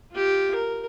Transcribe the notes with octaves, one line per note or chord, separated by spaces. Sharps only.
F4 G4
A#4